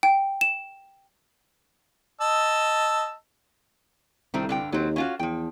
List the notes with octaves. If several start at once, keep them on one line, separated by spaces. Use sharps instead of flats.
G5
E7
D#5 A5 E6
C2 D#3 A3 C4
G2 D3 G5
D#2 F#3 C4
C#4 F4 F#4
E2 F3 G5